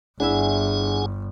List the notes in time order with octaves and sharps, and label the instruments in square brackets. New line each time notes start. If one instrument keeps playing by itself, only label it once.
[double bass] G1 [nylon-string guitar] D4 E4 E5 [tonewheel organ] G#4 F#5 G#5